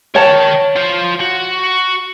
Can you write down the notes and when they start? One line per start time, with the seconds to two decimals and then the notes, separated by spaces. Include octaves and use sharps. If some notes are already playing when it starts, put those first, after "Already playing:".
0.15 A#4 C#5 G5 A5
0.76 F4 C5
1.20 F#4